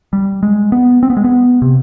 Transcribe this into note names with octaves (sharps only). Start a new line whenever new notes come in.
G3
G#3
B3
C4
B3
G#3
B3
C3